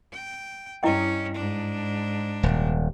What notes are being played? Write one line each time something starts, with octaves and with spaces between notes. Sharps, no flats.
G5
G2 C#4 E4 D#5 G5
G#2 D4
D#1